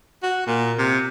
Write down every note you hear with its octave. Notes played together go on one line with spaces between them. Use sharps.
F#4
A#2
C3